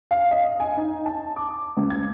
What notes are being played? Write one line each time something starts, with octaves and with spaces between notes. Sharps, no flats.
F5
D#5
G#5
D#4
A5
D6
C#2
G#6